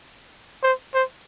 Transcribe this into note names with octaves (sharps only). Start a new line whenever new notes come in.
C5
C5